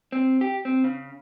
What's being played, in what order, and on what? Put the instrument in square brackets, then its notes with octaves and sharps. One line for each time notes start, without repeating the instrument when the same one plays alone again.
[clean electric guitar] C4
G4
C4
C#3